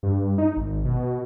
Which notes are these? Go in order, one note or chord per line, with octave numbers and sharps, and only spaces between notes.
G2
D#4
G#1
B2